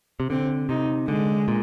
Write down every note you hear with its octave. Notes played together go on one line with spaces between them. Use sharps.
C3
D3 C4
C3 D#4
D3 G#3
A#2